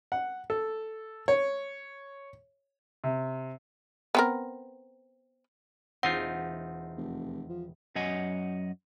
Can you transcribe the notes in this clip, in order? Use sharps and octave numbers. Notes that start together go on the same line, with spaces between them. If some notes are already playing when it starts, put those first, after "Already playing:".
F#5
A4
C#5
C3
B3 C4 A#4
E1 C4 D#4 F4 F#5
F1
F3
F#2 F#3 D#5 F#5 G#5